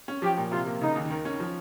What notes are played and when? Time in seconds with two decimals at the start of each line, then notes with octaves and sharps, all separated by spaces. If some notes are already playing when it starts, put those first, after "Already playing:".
0.08 C#4
0.22 F3 G4
0.37 A#2
0.52 C3 F4
0.66 A#3
0.81 C#3 D#4
0.96 D#2
1.10 D#3
1.25 C#4
1.40 F3